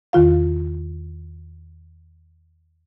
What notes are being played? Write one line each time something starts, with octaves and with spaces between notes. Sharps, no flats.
E2 D#3 F4 F5